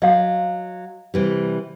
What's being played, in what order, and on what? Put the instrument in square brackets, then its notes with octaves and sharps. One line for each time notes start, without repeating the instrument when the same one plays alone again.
[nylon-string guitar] F#3 [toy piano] D#5 F5
[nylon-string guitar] C3 E3 G3